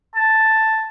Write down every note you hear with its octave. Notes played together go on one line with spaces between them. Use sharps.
A5